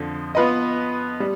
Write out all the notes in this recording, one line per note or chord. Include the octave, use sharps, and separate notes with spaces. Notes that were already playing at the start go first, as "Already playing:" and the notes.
Already playing: F2 D3 F3
B3 F4 B4 D#5
G3